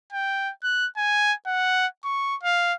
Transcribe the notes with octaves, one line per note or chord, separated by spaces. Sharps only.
G5
F#6
G#5
F#5
C#6
F5